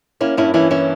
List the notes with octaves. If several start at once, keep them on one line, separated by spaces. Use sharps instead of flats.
A#3 C#4 E4
G2 C#4 E4
E3 C#4 E4
C#4 E4